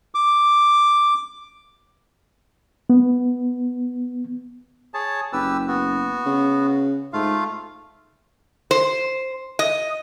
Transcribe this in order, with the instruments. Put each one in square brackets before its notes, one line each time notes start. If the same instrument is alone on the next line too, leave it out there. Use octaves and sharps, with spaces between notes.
[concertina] D6
[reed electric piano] B3
[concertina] G#4 C#5 A5
[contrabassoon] F#1 [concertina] G4 B4 E6
[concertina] B3 F#4
[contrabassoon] C#3
[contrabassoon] G#2 [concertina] A3 F4 F5
[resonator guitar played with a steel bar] C5
D#5